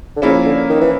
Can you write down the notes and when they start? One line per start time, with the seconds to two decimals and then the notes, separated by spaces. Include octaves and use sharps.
0.16 D3
0.22 C#3 F3 A#3 C#4 E4
0.45 D3
0.70 D#3
0.81 E3